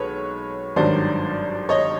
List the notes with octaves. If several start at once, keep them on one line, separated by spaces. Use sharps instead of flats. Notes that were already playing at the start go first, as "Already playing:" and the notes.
Already playing: B1 G#3 A4 B4 C#5
G#1 G2 D#3 F#3 C5 D5
C#5 D#5